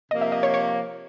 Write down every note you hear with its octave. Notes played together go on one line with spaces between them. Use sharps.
C3 F3 A#3 D#5
E5
D#5
C#5
C#5